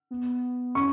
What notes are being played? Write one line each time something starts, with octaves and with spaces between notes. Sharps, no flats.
B3
C#4 C#6